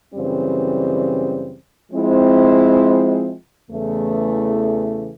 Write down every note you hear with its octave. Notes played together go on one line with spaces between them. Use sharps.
F#2 C#3 E3 G3 C4
F3 G#3 C4 E4
E2 C#3 E3 A3